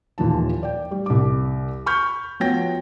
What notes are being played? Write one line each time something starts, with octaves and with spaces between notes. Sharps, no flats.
D#1 D#2 E3 F3 A5
D5 G5
G3
C2 D6
B5 C#6 F6 G6
F3 B3 F#4 C#5 G5 A#6